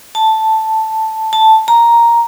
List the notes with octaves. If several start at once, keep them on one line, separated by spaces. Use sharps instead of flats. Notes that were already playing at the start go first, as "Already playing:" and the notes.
A5
A5
A#5